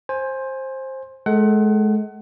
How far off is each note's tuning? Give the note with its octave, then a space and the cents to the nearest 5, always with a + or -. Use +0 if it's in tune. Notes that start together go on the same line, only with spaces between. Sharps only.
C5 +15 G#5 +0
G#3 +35 A4 +20 F#5 +25